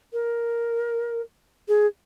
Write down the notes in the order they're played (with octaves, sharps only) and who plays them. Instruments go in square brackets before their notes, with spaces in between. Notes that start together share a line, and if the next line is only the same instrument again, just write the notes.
[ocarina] A#4
G#4